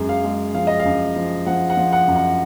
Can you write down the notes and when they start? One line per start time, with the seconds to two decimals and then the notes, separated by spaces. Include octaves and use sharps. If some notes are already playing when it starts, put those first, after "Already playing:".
Already playing: F#2 G#3 G#4
0.09 F5
0.24 G#3
0.55 F3 F5
0.67 D#5
0.80 F5
0.85 F#2
1.16 F3
1.46 F3 F#5
1.70 F#5
1.77 F3
1.93 F#5
2.08 F#2
2.16 F#5